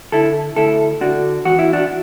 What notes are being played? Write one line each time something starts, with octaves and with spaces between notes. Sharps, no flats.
D3 E4 A4
D2 E4 A4
D3 D4 F#4
E2 F#4
E4
D4 F#4